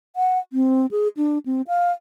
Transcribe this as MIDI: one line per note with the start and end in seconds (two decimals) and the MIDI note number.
0.16 0.39 78
0.53 0.86 60
0.91 1.08 68
1.17 1.38 62
1.46 1.62 60
1.68 1.91 77